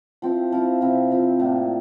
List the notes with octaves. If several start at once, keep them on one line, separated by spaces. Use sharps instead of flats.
F3 C4 E4
F3 C4 E4
C3 F3 C4 E4
C3 F3 C4 E4
A2 F3 A#3 D4